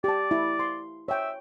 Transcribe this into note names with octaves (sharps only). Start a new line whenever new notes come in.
G4 D5 A5
E4
C6
C#5 E5 G5